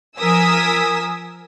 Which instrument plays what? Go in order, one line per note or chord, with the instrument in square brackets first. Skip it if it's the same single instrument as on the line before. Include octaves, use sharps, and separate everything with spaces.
[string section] F3 A#4 G#5 D#6 E6 B6